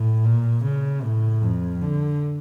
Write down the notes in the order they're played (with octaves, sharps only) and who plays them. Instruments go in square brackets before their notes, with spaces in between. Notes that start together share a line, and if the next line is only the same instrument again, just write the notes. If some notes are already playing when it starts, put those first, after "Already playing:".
Already playing: [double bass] A2
A#2
C#3
A2
F2
D3